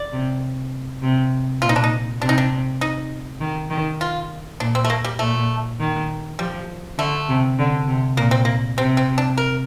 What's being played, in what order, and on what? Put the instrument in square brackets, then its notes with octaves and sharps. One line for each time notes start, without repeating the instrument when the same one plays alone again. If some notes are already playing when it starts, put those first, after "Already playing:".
Already playing: [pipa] D5
[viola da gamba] C3
C3
[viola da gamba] A#2 [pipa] F4
[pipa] D#4
D4
D#4
[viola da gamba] C3 [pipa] D4
[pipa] D#4
D4
D#4
[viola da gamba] D#3
D#3
[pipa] F4
[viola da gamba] A#2 [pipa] D4
[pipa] C4
A3
A#3
G3
[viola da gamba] A#2 [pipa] A3
[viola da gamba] D#3
[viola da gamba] F3 [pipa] G3
[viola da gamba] D3 [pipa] A3
[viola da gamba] C3
D3
C3
[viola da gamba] A#2 [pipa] A#3
[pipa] C4
A#3
[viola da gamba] C3 [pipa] C4
[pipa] C4
D4
A#4